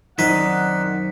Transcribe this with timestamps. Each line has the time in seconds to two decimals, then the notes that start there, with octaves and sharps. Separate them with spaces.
0.19 F#2 D#3 C4 D#4 D5 F#5 B6